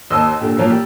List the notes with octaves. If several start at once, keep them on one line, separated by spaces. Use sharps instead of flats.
D#2 C5 D#5 A5 C6 E6
A#2 D3 G4
A#2 F3 F#3 A#3
G3 G4